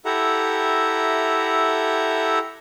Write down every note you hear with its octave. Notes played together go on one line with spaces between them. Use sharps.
E4 G4 A4 E5 F#5 A#5